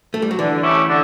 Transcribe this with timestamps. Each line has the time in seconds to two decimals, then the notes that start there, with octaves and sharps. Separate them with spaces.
0.14 A3
0.22 G3
0.31 F#3
0.39 D3 E3
0.63 A3 C#4 E4 G4
0.88 D3